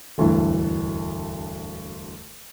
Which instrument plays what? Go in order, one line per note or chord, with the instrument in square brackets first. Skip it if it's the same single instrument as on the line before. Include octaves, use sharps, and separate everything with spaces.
[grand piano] E1 D2 G2 E3